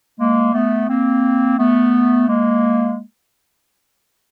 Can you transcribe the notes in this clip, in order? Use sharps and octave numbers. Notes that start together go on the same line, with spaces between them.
G#3 A#3
A3 B3
A#3 C4
A3 B3
G#3 A#3